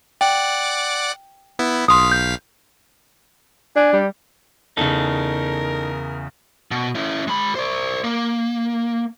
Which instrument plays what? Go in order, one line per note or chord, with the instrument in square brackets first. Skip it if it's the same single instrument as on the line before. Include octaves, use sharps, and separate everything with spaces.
[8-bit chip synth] D5 F#5 D6 [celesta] G5
[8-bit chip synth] B3 E4
[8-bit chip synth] B1 F5 B6 [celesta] C6 D#6
[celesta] G6
[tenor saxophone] D4 [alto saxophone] G#5
[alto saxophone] G3
[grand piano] E2 C#3 [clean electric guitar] D#4 A4 [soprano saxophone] A#4
[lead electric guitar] B2
C#4 E4
G#3 B5
C5 D5
A#3